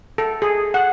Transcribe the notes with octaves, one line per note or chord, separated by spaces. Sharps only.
A4
G#4
F#5